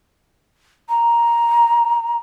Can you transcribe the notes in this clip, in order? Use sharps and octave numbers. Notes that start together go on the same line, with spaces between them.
A#5